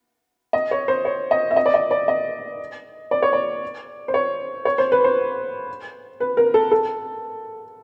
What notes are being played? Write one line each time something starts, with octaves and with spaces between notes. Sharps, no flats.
D#5
C#5
C5
C#5
D#5
E5
D#5
D5
D#5
D5
D#5
D5
C#5
D5
C5
C#5
C#5
C5
B4
C5
B4
A#4
A4
A4